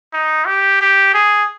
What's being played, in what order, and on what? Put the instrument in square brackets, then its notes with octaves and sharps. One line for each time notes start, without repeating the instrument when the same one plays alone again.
[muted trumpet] D#4
G4
G4
G#4